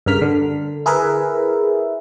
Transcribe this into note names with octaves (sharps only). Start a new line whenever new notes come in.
G2 C#3 A#4 F6 B6
D3
E4 G#4 A#4 B4 E5